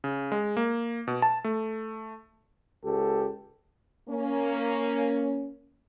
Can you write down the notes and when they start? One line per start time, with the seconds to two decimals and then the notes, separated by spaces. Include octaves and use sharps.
0.04 C#3
0.32 G#3
0.57 A#3
1.07 B2
1.22 A5
1.44 A3
2.84 C#2 G4 A4
4.09 A#3 C#4